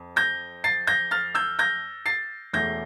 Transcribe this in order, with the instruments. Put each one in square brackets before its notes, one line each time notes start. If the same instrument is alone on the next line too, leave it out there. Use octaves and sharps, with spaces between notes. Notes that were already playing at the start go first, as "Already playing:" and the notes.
Already playing: [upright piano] F2
G6 A#6
A6 C7
G6 A#6
F6 A6
E6 G6
G6 A#6
A6 C7
E1 E2 E3 A3 G6 A#6